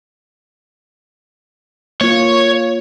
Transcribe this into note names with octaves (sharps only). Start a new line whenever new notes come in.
A#3 F4 C#5